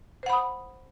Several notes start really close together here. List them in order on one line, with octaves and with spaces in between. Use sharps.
C5 F#5 B5 D#6